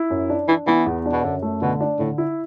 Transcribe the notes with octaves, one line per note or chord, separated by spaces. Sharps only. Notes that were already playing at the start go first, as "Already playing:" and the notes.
Already playing: E4
F#2
D4
E3 D4
E3 B3
E2
D4
B2
F#2 D3
A3
B2 D3
D4
A2 D3
E4